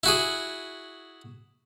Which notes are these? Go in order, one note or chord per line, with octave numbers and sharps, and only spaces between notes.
E4 F#4 G#4